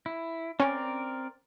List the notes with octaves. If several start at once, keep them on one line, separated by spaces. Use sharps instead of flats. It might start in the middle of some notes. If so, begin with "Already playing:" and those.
E4
C4 C#4 A#4 D5